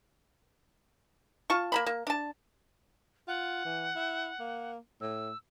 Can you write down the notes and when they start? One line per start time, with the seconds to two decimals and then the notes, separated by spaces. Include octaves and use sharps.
1.50 F4 A5 C#6
1.72 A#3 A#5 B5
1.86 A#3
2.07 D4 A5
3.28 F4 F#5
3.65 E3
3.96 E4
4.40 A#3
5.01 A2 E6